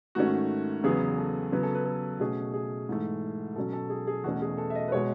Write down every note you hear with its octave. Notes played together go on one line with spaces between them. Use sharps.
G#2 D#3 A3 C#4 F#4
E2 C#3 F#3 B3 G#4
A4
C#3 F#3 B3 B4
A4
B4
A4
B2 A3 C#4 G#4
G#4
G#2 E3 A3
B2 F#3 C#4 A4
A4
G#4
G#4
E2 B2 A3 C#4 F#4
G#4
A4
E5
D#5
B4
B2 G#3 C#5